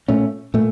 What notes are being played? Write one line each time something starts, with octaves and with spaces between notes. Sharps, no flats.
A#2 A3 C#4
A#2 A3